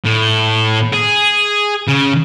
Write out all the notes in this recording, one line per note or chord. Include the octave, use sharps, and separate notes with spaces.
A2
G#4
C#3